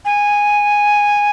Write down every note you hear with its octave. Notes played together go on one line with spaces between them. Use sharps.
G#5